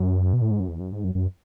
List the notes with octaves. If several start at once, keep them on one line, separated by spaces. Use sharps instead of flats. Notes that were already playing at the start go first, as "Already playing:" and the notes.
Already playing: F#2
B2
A2
G#2
F#2
E2
F#2
G#2
F#2
F#2